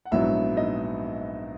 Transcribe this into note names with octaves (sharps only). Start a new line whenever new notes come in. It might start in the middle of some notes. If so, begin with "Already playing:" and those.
F#5
A#1 G#2 F#3 B3 D#4 E4 E5
D#4 D#5